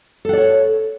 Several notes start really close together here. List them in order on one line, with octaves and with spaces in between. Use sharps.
A4 F#5 D5 C#5